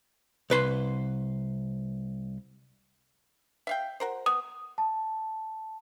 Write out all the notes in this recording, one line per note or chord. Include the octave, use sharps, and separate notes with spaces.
C2 B4 C6
E5 F5 G5
F#4 A#4 C5
B3 D#6
A5